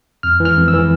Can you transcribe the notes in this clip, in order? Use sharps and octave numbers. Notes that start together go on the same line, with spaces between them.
F2 F6
E3
F6
F2
E6
E3